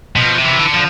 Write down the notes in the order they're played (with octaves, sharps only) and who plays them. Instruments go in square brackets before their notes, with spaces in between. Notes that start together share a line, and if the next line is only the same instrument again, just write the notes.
[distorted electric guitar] B2 [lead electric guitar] F3
[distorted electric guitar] C3
[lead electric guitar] E3
[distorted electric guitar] D3
[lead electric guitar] F3